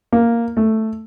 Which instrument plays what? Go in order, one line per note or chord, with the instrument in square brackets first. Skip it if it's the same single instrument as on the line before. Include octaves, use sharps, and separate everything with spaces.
[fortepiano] A#3
A3